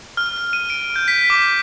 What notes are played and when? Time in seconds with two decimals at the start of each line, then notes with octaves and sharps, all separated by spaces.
0.17 F6
0.53 D#7
0.70 D7
0.96 G6
1.08 B6
1.30 D6